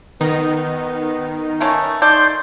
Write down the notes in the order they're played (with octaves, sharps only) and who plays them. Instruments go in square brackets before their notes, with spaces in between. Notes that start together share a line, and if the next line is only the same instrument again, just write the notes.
[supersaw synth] D#3 D#4 [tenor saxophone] B3
[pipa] A3 A#3 C#4
[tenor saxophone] D#4 [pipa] A4 D5 [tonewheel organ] C6 G6